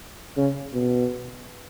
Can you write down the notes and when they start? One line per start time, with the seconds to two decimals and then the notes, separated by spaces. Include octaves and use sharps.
0.37 C#3
0.73 B2